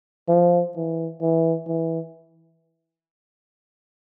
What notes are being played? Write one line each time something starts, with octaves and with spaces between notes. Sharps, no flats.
F3
E3
E3
E3